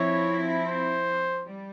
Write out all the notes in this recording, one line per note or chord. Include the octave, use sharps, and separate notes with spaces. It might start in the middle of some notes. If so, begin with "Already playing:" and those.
Already playing: F3 C4 E4 C#5
C5
G3